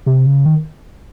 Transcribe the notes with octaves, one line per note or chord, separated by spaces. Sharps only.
C3
C#3
D#3